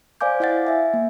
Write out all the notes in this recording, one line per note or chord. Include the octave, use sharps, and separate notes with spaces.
C5 D5 F5 G#5 D6 G6
E4 D#5 F5 F#5 A6
E5 G#5
A#3